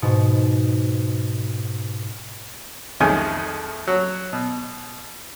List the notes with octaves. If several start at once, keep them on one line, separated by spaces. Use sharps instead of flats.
G#2 B2
C2 F2 D#3 F3 G#3 G#5
F#3
B2